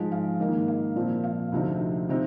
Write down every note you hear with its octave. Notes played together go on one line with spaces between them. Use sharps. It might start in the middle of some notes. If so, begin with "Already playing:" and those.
Already playing: G#2 F3 G#3
F5
G#2 D#3 A#3 D#4
F5
A#2 F3 C4
F5
D2 C3 F3 C4 D#4
C3 F3 C4 D#4